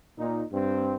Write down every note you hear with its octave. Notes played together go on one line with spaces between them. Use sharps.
A#2 D#4
G2 C4